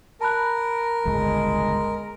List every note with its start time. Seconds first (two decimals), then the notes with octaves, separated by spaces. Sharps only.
0.21 A#4 A5 B5 F#6
1.05 D1 G1 C#2 G#3